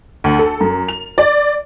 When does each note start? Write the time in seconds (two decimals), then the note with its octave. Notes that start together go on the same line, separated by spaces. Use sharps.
0.24 D2
0.39 A4
0.61 F#2
0.88 F7
1.18 D5